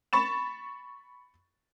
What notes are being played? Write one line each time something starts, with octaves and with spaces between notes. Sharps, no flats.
B5 C#6 A6 E7